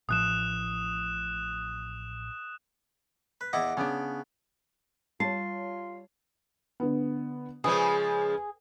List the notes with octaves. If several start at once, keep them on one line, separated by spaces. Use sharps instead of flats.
A1 A2 F3 D#6 F#6 E7
B4
E2 E4 D#5 F#5 D6
C#3 B3 C#4 D4
G3 F4 C#5 A5 C7
D3 B3
C#3 F3 G#3 G#4 B4